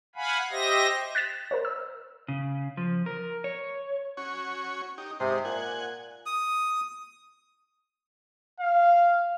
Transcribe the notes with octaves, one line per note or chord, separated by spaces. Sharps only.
F5 F#5 G#5 B5
G4 C5 D#5 E5 A#6
F#6 A6 B6 E7
A#4 C5 C#5
E6
C#3
F3
A#4
C#5
C#4 F#4 C#5
D#4 G4
G#2 C3 D#4 C5
A#2 F#5 G#5
D#6
F5